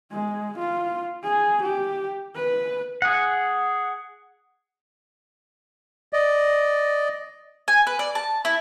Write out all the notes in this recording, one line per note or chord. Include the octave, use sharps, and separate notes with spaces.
G#3
F4
G#4
G4
B4
G#4 F#5
D5 D#5
G#5
B4
D5
A5
E4